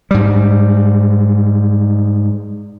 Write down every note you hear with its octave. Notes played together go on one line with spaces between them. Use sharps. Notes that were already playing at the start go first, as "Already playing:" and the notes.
G#2 G3